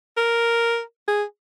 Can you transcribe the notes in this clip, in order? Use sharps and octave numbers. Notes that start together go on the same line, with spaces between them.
A#4
G#4